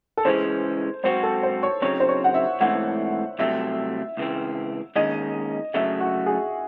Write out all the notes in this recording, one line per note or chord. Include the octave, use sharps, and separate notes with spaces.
A4
C#3 E3 G#3 C#4 C5
G#2 F#3 C4 F#4 C5
A4
C5
C#5
C#3 F#3 C4 D#4 C#5
C5
C#5
F#5
E5
G#2 E3 A3 C4 F#5
C2 C3 F#3 A3 C4 E5
C#2 C#3 E3 C4
D#2 D#3 G#3 C#4 D#5
F#2 C#3 F#3 A3 C#4 E5
F#4
G#4